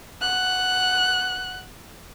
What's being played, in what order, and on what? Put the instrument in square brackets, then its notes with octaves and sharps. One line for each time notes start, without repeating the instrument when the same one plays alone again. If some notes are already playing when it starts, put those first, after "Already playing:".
[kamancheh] F#5 F#6